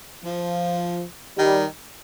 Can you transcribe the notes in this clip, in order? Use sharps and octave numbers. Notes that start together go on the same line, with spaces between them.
F3
D#3 G3